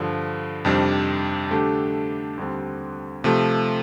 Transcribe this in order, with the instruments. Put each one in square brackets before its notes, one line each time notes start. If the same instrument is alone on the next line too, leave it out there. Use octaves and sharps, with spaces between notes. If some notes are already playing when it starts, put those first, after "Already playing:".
Already playing: [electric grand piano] G2 D3 F3
F2 C3 D#3 G3 D4
D3 A3 D4 G4
D#2 D3 G3 C4
C3 F3 A3